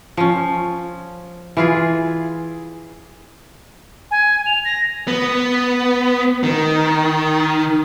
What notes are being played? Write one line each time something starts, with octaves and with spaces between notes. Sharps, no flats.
F3 C#4
E3 F4 G#4
G#5
F7
A#6
B3
D#3